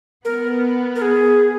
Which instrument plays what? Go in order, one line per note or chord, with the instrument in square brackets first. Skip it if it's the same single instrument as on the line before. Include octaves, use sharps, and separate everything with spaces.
[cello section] B3 [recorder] A#4
[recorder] A#4
G#4